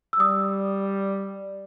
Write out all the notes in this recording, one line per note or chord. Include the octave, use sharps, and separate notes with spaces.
E6
G3 D#6